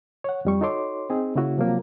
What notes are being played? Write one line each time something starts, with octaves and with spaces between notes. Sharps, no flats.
C#5 F#5
F2 G3 C#6
D#4 F#4 A4 C#5 C6 D6
C4 D#4 G#4
C#3 A#3 E4 F#4
C3 F3 F#3 A#3